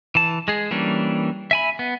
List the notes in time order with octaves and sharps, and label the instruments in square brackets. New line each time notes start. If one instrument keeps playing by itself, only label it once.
[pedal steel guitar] E3 A5
G#3 G#4
E3 G3 A#3 C#4 D4
E5 G#5 B5
B3